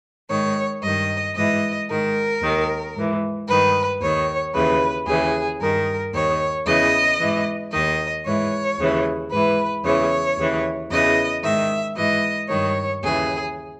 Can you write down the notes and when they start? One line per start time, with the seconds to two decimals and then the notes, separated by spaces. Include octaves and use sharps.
0.30 G#2 D#3 C#5
0.83 G2 D#3 D#5
1.36 G#2 E3 D#5
1.89 G#2 D#3 A#4
2.42 D#2 D#3
2.95 G#2 E3
3.48 G2 D#3 B4
4.01 D#2 D#3 C#5
4.54 D#2 C#3 E3 B4
5.07 D#2 C#3 E3 G#4
5.60 G2 D#3 A#4
6.13 D#2 D#3 C#5
6.66 E2 C#3 E3 D#5
7.19 G#2 E3
7.72 D#2 D#3 D#5
8.25 G#2 E3 C#5
8.78 D#2 C#3 E3
9.31 G#2 E3 B4
9.84 E2 C#3 E3 C#5
10.38 D#2 C#3 E3
10.90 E2 C#3 E3 D#5
11.43 G#2 D#3 E5
11.96 G#2 E3 D#5
12.49 G2 D#3 C#5
13.02 D#2 C#3 E3 G#4